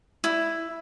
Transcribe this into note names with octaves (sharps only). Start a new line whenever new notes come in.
E4